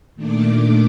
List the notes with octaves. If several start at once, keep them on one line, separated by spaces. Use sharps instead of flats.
A#2 D#3 A3 D4 D6